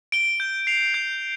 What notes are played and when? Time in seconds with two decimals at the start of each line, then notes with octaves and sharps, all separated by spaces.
0.12 D7 G7
0.40 G6
0.67 C7 F7
0.94 G6